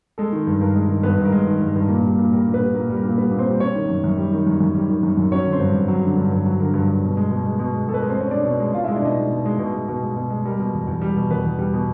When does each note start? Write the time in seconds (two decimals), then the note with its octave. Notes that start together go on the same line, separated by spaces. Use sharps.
0.18 G#3 A4
0.32 D#3
0.47 G2
0.61 G2 A#4
0.76 G#3
0.89 D#3
1.03 G2 B3 B4
1.18 G2
1.25 A#4
1.32 G#3
1.47 D#3
1.62 G2
1.76 G2
1.89 A#2
2.04 G3
2.18 A#2
2.33 G3 A#4
2.47 A#2
2.54 B3 B4
2.61 G3
2.75 A#2 A#4
2.89 G3
2.96 A#4
3.04 A#2
3.18 G3 B3 B4
3.31 A#2
3.39 C4 C5
3.47 G3
3.60 G3 C#4 C#5
3.75 D#3
3.89 F#2
4.04 F#2
4.18 G3
4.32 D#3
4.47 F#2
4.60 F#2
4.75 G3
4.89 D#3
5.03 F#2
5.17 F#2
5.32 F#3 C#4 C#5
5.46 D3
5.52 C4 C5
5.60 G2
5.74 G2
5.88 F#3
6.03 D3
6.17 G2
6.32 G2
6.46 F#3
6.60 D3 A#4
6.74 G2
6.88 G2
7.03 B2
7.17 G#3
7.31 B2
7.46 G#3
7.59 B2
7.74 G#3
7.88 B2 A4
7.94 B4
7.99 G#3 A#4
8.10 C4 C5
8.17 B2 C#4 C#5
8.31 G#3 D4 D5
8.45 B2
8.60 G#3
8.74 B2 F4 F5
8.84 G#3 E4 E5
8.96 D4 D5
9.02 B2 D#4 D#5
9.17 G#3
9.31 B2
9.46 G#3
9.59 B2
9.73 G#3
9.88 B2
10.02 G#3
10.16 B2
10.30 G#3
10.45 G3 A#4
10.59 B2
10.73 E2
10.87 E2
11.02 G3
11.16 B2
11.30 E2 B3 B4
11.45 E2
11.59 G3
11.74 B2